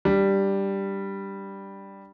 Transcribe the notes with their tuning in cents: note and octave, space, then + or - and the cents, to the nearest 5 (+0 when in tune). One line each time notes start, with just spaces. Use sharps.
G3 +0 D4 +0